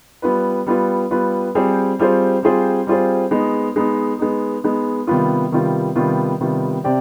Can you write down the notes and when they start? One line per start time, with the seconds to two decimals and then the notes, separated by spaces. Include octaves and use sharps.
0.22 G3 B3 F4 B4
0.67 G3 B3 F4 B4
1.11 G3 B3 F4 B4
1.55 G3 C4 F4 G#4 C5
1.99 G3 C4 F4 G#4 C5
2.43 G3 C4 F4 G#4 C5
2.87 G3 C4 F4 G#4 C5
3.31 G#3 B3 D#4
3.76 G#3 B3 D#4
4.19 G#3 B3 D#4
4.64 G#3 B3 D#4
5.07 C3 D#3 G3 B3 F4
5.52 C3 D#3 G3 B3 F4
5.96 C3 D#3 G3 B3 F4
6.40 C3 D#3 G3 B3 F4
6.84 C3 C4 G4 D5